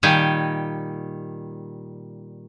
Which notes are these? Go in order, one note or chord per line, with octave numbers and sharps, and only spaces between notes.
A#2 D#3 G3 G5 G#5